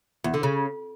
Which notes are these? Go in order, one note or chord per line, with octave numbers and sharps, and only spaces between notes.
E2
D3
C#3